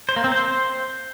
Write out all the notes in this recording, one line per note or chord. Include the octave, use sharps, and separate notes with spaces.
C5
A#3
C4
C5